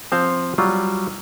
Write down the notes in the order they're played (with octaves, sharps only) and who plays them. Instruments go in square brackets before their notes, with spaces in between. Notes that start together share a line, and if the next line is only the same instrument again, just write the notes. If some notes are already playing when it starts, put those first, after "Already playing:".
[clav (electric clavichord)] F3 C4 C5 F5
F#3 G3 F4